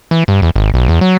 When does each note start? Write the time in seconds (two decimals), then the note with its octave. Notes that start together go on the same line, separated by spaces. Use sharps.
0.11 E3
0.28 G2
0.42 E2
0.56 G#1
0.74 B1
0.89 E2
1.01 F#3